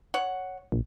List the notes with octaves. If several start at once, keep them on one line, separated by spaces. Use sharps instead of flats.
C#5 F#5
A#1